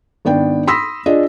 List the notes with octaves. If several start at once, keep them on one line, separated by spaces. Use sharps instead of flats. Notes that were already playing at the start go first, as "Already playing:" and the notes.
G#1 B3 D4 G5
B5 C6 D#6 E6 A#6 B6
D4 F4 G#4 D#5